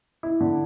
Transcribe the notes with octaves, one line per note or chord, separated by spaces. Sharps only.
E4
D3